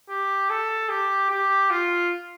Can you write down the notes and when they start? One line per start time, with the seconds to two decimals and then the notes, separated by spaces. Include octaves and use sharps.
0.09 G4
0.50 A4
0.89 G4
1.30 G4
1.70 F4